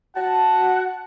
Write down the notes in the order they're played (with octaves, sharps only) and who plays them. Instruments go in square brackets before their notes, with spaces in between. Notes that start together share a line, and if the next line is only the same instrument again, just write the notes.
[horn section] F#4 F#5 [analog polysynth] A5